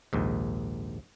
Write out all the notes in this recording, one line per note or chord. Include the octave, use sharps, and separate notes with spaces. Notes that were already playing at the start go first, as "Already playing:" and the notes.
A#1 D#2 G#2